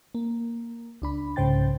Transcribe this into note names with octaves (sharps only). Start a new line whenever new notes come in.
A#3
C#2 D4 B5
C2 G#2 C#3 C5 G5 A6